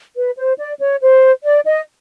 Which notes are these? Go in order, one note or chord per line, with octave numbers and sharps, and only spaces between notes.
B4
C5
D5
C#5
C5
D5
D#5